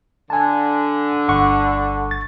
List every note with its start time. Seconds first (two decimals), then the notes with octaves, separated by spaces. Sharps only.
0.30 D3 G#5 A5
1.29 G1 F#5 C#6
2.11 A6